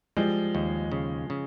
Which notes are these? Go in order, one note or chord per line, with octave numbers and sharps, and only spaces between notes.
F3 G3 G#3
D#2
C#3
C#3